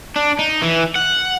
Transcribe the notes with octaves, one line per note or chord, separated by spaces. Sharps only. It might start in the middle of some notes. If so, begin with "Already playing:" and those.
D4
D#4
E3
F#5